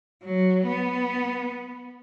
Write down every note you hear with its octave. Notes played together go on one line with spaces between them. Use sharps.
F#3
B3